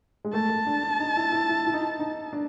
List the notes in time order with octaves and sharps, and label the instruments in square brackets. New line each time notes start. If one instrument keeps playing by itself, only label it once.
[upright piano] G#3
[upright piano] A3 [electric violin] A5
[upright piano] A3
D4
D4
D#4
E4
E4
E4
E4
D#4
E4
D#4
D4